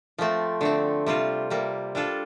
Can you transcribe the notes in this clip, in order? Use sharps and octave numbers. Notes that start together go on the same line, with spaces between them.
F3 A3 C4
D3 A3 C4
C3 G3 C4 F4
C3 G3 A#3
G3 D4 F4 A4